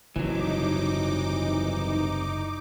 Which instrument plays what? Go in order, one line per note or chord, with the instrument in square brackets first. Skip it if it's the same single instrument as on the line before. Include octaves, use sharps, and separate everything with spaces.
[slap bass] F#1 G#2 [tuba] C2 [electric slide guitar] E3 F#3 [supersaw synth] D#4 D6